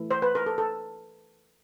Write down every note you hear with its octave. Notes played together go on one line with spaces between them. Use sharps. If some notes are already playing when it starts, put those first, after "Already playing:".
Already playing: E3 A3
C5
B4
A#4
A4
A4